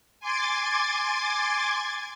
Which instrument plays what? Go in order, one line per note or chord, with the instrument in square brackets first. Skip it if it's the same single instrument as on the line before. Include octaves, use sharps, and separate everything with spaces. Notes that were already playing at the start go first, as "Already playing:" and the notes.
[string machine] G#5 C6 D6 G#6 A6